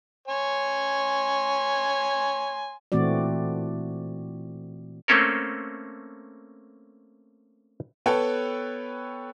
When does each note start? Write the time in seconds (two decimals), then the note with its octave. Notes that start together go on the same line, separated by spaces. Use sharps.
0.28 C#5 G#5 C6
2.92 A#2 E3 A3 C4 F#4 D5
5.08 A3 A#3 C4 C#4 A4 A#4
8.06 B3 A4 B4 C#5 G5 A5